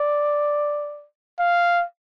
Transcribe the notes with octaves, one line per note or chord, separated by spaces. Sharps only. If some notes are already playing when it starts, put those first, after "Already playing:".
Already playing: D5
F5